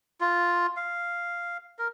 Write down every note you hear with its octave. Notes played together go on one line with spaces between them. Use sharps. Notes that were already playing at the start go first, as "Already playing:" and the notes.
F4
F5
A#4